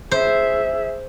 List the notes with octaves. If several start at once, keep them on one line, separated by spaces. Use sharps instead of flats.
G#4 C5 E5